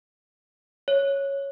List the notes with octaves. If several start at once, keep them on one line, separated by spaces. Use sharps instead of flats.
C#5